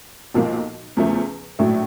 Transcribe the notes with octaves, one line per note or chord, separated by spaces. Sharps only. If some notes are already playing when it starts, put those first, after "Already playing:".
B1 A#2 F3 A#3
E2 C#3 F3 A3
A#1 A2 F#3 A3